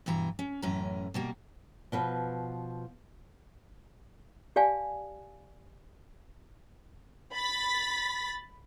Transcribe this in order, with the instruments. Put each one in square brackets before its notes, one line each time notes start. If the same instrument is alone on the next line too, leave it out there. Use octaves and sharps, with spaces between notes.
[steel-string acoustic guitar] G2 B2 E3 A#5
C#4
F#2 A2 E3 C#4 A#5
B2 G3 A#3
[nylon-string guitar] B2 F3 B4
[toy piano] G4 D5 F5 G#5 A5
[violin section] B5 A6 B6